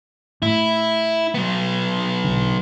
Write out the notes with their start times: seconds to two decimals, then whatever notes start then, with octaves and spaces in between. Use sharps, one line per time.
0.42 A2 E4
1.34 F#3 B3
2.24 B1 D3